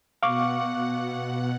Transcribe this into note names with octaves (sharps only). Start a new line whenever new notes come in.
B2 F5 F#5 C#6 D6